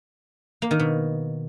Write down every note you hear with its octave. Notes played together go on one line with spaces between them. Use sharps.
A#3
D#3
B2